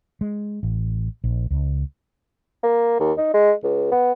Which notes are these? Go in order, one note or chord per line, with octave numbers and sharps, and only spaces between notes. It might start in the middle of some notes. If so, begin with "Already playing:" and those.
G#3
A1
A#1
C#2
A#3
D#2
D#4
G#3
C#2
B3